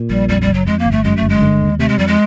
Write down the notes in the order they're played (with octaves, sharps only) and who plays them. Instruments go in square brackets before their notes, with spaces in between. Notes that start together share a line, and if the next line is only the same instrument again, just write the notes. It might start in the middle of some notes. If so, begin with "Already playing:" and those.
Already playing: [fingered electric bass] A#2
[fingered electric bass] A#1 [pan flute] G3
[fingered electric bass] F2 [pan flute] G3
[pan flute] G3
[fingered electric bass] F#1
[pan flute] F#3
[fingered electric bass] F2 [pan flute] G#3
[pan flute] A#3
[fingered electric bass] G1
[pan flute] A3
[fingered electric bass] F#2 [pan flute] G#3
[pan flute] A3
[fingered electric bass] G1
[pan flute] G#3
[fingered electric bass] D3
D#2
[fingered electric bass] C3 [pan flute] A3
[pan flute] G#3
[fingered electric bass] F2 [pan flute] G3
[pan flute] G#3